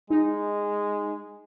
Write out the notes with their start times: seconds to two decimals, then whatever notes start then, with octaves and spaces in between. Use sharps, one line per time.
0.10 G#3 D#4